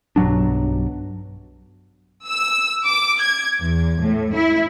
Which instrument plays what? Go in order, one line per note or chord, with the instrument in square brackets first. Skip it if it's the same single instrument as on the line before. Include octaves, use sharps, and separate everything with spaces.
[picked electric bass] B1 G2 F#3 D4
[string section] E6
D6
G#6
E2
A2
E4